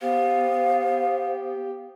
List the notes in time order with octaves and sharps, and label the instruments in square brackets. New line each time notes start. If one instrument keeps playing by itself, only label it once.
[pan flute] B3 [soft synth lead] G4 [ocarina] C5 [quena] F5